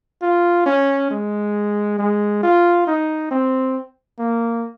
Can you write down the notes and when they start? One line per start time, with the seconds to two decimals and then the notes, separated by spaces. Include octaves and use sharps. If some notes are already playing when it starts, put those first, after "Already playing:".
0.22 F4
0.66 C#4
1.11 G#3
1.99 G#3
2.43 F4
2.87 D#4
3.31 C4
4.19 A#3